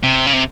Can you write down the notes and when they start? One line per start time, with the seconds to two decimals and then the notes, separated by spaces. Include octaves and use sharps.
0.03 C3
0.26 C#3
0.33 C3